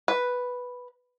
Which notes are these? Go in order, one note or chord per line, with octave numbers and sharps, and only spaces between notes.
B4